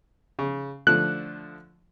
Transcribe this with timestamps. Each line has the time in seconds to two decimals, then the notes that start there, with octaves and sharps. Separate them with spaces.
0.39 C#3
0.87 D3 F3 A3 F#6